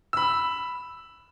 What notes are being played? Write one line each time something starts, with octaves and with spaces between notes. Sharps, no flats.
B5 E6